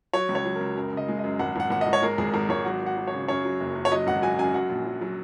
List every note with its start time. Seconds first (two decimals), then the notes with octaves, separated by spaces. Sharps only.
0.14 F#3 C#5
0.29 C#2
0.35 C#5
0.45 F#3
0.56 C#2 A#4
0.76 F#2 A#4
0.92 C#3 D#5
1.08 G#3
1.19 F#2 D#5
1.39 G#1 F#5
1.56 G#1 F#5
1.70 G#1 F#5
1.81 D#5
1.87 G#1
1.93 C#5
2.02 G#3 A#4
2.18 G#1 G#4
2.34 G#1 A#4
2.49 G#1 C#5
2.65 F#3 F#5
2.81 F#3
2.86 F#5
2.97 F#3
3.07 C#5
3.13 C#3
3.28 F#2 C#5
3.44 F#3
3.60 F#1
3.75 F#1
3.85 C#5
3.92 F#3 D#5
4.07 G#1 F#5
4.22 F#3 G#5
4.39 F#2 G#5
4.54 F#3 F#5
4.70 A#1
4.85 F#3
5.01 F#3